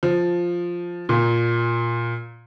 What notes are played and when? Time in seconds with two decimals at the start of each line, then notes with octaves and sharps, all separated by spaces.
0.03 F3
1.09 A#2